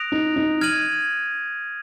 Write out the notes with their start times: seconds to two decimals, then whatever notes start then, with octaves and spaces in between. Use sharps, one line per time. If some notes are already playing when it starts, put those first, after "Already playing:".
Already playing: D#6 F#6 A#6 D7 F7
0.12 D#4
0.36 D#4
0.61 F6 G#6 D#7 F#7